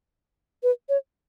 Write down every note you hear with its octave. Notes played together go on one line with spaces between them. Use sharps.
B4
C#5